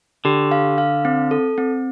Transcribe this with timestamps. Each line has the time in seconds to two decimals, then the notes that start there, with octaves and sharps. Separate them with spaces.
0.25 D3 G4
0.51 F5
0.78 F5
1.05 C4
1.31 A4
1.58 C4